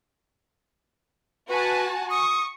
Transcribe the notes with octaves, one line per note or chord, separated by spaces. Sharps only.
F#4 B4 G#5 A5
C#6 D#6